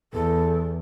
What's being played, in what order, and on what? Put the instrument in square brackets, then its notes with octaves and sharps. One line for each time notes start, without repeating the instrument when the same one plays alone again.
[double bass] E2 [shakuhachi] A4